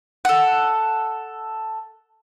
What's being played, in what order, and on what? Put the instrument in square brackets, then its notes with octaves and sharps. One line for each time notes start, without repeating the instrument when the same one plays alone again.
[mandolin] A4 F#5